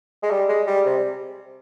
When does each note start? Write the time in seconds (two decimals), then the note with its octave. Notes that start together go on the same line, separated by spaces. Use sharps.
0.23 G#3
0.30 G3
0.49 G#3
0.67 G3
0.85 C3